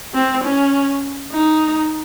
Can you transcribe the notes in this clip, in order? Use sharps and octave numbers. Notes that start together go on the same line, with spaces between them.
C4
C#4
D#4